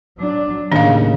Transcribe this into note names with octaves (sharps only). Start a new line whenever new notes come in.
F#3 D4
D#2 A2 C#3 D4 F5